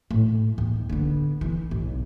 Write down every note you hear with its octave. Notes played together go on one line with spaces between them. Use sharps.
A2
D#2
D3 B3
E3
B1